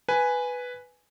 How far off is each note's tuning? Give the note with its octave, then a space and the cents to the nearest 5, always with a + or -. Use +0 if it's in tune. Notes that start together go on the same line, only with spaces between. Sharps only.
B4 +0 G#5 +0